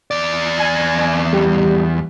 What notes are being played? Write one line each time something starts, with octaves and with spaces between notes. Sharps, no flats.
E2 D5
G#5
G3